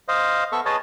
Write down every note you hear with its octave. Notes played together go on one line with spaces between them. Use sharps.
C5 D#5 F5
B3 A4 E5 C#6
G#4 B4 C#5 D#5 A5